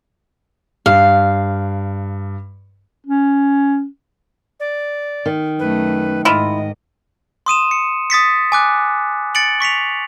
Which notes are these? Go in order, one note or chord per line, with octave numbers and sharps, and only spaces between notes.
G2 F5
C#4
D5
D#3
F#2 A3 B4
G#2 E4 F4 D#5
C6 D#6 D#7 E7
C#7
D#6 A6 B6 C#7
G#5 D6 F#6
A6 C#7 D7 F#7
C#6 B6 C#7 F7